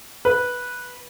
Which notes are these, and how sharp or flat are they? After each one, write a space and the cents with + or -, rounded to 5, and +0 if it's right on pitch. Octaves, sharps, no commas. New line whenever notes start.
B4 -10